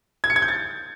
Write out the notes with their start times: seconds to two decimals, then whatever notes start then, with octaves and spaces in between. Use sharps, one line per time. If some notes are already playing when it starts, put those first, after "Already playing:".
0.24 G#6
0.30 C#7
0.36 G#6
0.42 G6
0.48 A6